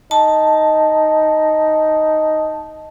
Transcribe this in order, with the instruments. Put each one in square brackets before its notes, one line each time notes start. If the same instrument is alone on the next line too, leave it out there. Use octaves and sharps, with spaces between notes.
[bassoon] D#4 [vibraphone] A5